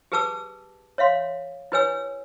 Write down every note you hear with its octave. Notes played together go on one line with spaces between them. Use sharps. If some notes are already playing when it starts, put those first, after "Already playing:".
G4 G#4 B4 A5 D6 E6
C#5 E5 F5 C6
E4 G4 B4 C#5 G#5 E6